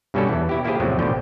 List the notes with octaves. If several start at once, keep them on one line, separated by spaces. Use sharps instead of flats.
G2 B2 G3 C#4 F#4 A4
E2 E3
B2 E4 G4
A#3 E4 F4 G4 G#4 C5
E2 A2 C3 F3 F#3 A3
A1 B2 D3 F3 G5